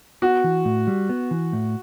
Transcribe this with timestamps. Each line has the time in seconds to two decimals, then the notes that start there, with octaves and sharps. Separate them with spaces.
0.22 B3 F#4
0.44 E3
0.65 A2
0.87 G3
1.09 B3
1.31 E3
1.53 A2